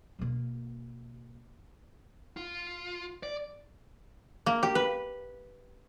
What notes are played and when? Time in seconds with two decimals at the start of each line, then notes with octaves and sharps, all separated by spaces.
0.19 B2 A#3
2.37 F4
3.23 D5
4.46 A#3
4.63 G4
4.75 B4